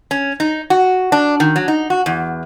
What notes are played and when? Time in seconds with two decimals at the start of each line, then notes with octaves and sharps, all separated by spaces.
0.11 C#4
0.40 D#4
0.70 F#4
1.12 D4
1.40 D#3
1.56 F#3
1.68 D#4
1.90 F#4
2.06 E2